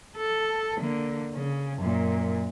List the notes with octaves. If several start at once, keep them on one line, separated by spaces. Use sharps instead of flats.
A4
D3 A#3
C#3
F#2 A#2